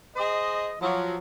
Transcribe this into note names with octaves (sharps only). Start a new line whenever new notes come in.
G#4 C5 D#5
F3 F#3